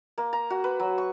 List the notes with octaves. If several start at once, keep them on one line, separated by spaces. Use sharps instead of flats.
A#3
A#5
F#4
B4
F#3
C#6